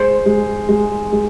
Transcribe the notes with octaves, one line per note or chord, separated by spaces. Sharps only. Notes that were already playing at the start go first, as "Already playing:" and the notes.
Already playing: G#3 C5
G#3
G#3
G#3